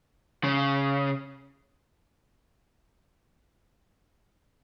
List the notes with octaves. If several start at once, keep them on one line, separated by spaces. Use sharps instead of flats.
C#3